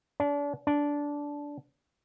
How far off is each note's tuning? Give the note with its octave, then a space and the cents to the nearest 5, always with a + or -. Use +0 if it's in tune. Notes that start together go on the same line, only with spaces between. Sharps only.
D4 -35
D4 -15